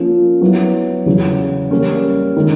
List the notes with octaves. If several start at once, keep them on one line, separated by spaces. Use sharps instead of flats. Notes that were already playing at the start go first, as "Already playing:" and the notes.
Already playing: F3 A#3 C#4
F#3 B3 E4
E2 C#3 F#3
G3 A#3 C#4
D#3 G#3